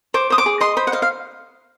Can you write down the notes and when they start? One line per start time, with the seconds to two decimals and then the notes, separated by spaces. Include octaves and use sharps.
0.14 C5 D6
0.30 C5 D#6
0.38 D6
0.46 G#4
0.61 D#5 C6
0.77 C5 B5
0.87 F#5
0.92 D#5 F5
1.02 F5